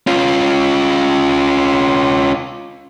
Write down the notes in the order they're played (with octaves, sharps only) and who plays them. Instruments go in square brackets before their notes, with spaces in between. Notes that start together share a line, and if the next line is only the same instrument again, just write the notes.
[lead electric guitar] C#4 F4